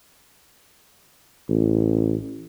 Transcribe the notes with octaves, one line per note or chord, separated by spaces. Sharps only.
A1